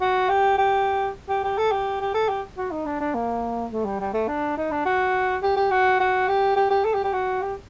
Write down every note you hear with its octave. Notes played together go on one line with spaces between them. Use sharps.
F#4
G4
G4
G4
G4
A4
G4
G4
A4
G4
F#4
D#4
D4
D4
A#3
A3
G3
G3
A3
D4
D#4
D4
F#4
G4
G4
F#4
F#4
G4
G4
G4
A4
G4
G4
F#4
G4